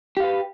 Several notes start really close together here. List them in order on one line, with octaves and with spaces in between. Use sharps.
G4 F5 B4